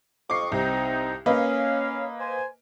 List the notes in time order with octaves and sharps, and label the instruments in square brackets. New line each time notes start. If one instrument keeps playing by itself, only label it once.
[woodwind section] F2 D#5 C#6 [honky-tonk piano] D6 C7
[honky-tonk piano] C2 [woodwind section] C4 D#4
[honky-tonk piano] A#3 B4 D#5 [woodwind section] C#4 F5
[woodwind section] C5 G#5